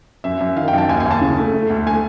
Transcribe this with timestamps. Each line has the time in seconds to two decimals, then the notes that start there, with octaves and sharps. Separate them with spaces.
0.24 F#2 E5
0.40 F#2
0.56 D#3 F5
0.68 G5
0.73 F#2 A5
0.89 D#2 G#5
1.00 G#5
1.05 D#2
1.11 A5
1.21 C#3
1.38 A3
1.54 A3
1.70 D2
1.86 A3 G#5